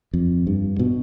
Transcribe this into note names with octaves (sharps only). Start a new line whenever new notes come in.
F2
G2
B2